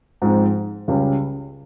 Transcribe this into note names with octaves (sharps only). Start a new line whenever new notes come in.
G#2 F3 G#3 C4
C#2 C#3 G3 C#4 G4